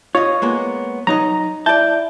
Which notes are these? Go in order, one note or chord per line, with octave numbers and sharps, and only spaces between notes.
F4 C#5 D#5
G#3 A#3 B3
F#3 D#4 D#5 A#5
E4 D5 A5 G6